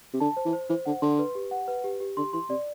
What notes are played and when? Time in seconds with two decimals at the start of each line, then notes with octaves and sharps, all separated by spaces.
0.13 C3
0.20 D3 A5
0.37 C5
0.45 E3
0.53 C5
0.69 E3 C5
0.86 D3 F#5
1.02 D3 C6
1.19 B4
1.35 G4
1.51 F#5
1.68 B4
1.84 G4
2.00 G4
2.17 D3 C6
2.33 E3 C6
2.49 C3 D5